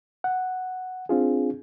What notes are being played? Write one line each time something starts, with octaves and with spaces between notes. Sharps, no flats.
F#5
C4 D4 F4 G#4